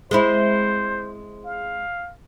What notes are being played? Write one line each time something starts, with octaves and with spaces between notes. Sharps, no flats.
G#3 C4 E4 C5
F5